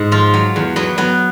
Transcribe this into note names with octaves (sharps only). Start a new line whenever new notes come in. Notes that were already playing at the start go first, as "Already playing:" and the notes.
Already playing: G#2
F3 F4
F#3
E2
F#3 B3
F#3 B3